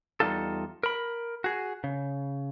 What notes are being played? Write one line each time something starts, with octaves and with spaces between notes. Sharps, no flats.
E2 G3 D#4 F4 A4
A#4 B5
F#4 G#4
C#3